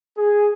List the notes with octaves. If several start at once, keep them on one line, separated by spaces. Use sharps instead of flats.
G#4